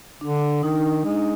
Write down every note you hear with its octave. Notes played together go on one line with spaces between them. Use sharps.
D3 D4
D#3 D#4
G#3